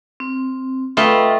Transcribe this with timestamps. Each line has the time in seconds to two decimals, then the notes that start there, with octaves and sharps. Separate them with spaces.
0.20 C4
0.97 A3 F4 B4 D#5 G5 B5